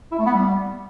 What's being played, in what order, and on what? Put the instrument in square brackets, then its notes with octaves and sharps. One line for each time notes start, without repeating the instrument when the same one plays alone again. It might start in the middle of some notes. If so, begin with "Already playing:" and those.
[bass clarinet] E4
A3
B3
G3